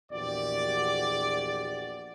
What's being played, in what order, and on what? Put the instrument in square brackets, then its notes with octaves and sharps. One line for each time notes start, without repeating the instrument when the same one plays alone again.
[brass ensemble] A#1 E2 F#4 G4 D5